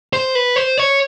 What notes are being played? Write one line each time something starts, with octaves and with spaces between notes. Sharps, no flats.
C5
B4
C5
C#5